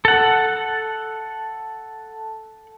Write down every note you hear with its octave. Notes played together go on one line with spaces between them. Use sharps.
A4 F#5